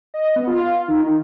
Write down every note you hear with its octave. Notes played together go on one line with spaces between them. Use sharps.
D#5
B3
F4
D#3